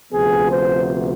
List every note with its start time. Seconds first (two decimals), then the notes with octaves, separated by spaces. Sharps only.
0.12 D2 C3 F3 B3 G#4
0.49 C5